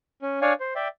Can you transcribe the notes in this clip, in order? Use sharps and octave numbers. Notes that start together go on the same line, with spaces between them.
C#4
D4 C#5 D5 F5 G#5
C5
D5 E5 G5